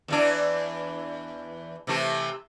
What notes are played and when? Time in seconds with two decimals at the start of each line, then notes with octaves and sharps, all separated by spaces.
0.08 E2 E3 D4
1.87 C3 E3 A3